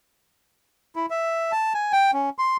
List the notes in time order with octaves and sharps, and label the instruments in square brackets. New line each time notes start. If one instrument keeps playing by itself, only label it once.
[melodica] E4
E5
A5
G#5
G5
C#4
C6